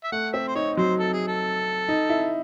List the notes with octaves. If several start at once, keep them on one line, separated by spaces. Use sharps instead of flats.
E5
A3 F#5
C4 E5
C5
D#4 C#5
F#3 C5
A4
G#4
A4
D#4
E4